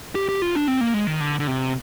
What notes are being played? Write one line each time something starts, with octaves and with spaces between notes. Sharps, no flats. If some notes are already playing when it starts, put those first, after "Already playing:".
G4
G4
F4
D4
C4
A#3
G#3
D#3
D3
D3
C3